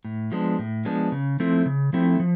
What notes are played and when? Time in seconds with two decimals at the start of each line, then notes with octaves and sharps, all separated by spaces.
0.05 A2
0.32 F3 G#3 B3 D4
0.59 A2
0.85 F3 G#3 B3 D4
1.12 C#3
1.40 F3 A3 C4 E4
1.66 C#3
1.93 F3 A3 C4 E4
2.20 F3